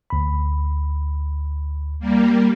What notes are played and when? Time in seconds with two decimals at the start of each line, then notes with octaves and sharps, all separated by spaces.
0.10 D2 B5
2.00 G3 A#3